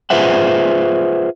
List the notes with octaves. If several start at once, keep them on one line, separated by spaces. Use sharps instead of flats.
F4 G#4 B4 C5 E5 F#5